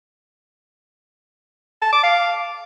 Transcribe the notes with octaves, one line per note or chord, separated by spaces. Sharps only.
A5
D6
F5